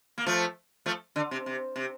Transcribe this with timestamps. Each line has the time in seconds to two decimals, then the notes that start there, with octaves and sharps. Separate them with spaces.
0.18 A#3
0.26 F3 A3
0.86 F3 A3
1.16 D3
1.31 C3
1.46 C3
1.76 C3